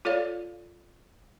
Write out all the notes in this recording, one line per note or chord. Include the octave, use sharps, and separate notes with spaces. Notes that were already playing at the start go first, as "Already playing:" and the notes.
F4 A4 C#5 D5 F5